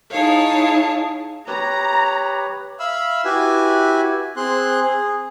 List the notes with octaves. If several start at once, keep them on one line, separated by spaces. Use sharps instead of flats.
D#4 E4 G#4 C#5 F5 A5
G4 B4 C#5 A#5
E5 F5 B5 E6
E4 F#4 G4 B4 E5 G#5
C4 G#4 C6 F#6
G#4